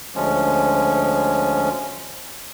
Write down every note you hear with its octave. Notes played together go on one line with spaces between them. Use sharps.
D2 F3 G#3 C#4